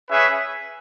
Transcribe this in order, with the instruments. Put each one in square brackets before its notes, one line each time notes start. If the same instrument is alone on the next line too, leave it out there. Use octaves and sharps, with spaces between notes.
[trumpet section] C#4 G#4 B4 E5